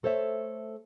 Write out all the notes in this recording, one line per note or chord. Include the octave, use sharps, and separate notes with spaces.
A3 A4 C5 C#5 E5